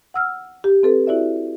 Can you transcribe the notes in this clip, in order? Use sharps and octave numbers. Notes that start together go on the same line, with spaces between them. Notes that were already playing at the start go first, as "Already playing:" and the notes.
F#5 E6 F6
G4
C4 A4 B4
E4 F#4 D5 E5